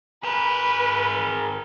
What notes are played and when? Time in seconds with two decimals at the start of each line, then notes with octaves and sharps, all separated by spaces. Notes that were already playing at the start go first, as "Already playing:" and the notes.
0.23 G#4 A#4 B4